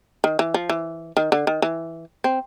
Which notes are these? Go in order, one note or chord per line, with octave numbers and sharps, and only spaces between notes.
D#3
E3
F3
E3
D#3
D3
D#3
E3
C4